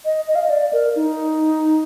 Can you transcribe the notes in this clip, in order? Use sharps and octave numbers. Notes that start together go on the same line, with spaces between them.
D#5
D#5
F5
D#5
D5
A#4
D#4